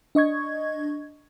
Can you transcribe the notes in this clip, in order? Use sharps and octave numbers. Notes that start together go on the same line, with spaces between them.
D4 D#5 C#6 G#6